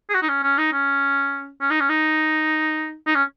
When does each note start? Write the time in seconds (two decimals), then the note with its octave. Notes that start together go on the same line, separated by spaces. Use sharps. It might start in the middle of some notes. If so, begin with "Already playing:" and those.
0.10 G#4
0.15 F#4
0.22 D#4
0.29 C#4
0.43 C#4
0.58 D#4
0.73 C#4
1.61 C#4
1.70 D#4
1.80 C#4
1.90 D#4
3.07 D#4
3.15 C#4